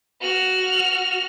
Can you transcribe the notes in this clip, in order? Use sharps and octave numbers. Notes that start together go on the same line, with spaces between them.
F#4 F6